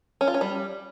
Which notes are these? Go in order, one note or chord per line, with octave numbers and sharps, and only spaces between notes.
C#4
F4
C#4
G3